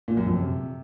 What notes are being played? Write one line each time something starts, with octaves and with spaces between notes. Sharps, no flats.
A#2
F#2
F2
C3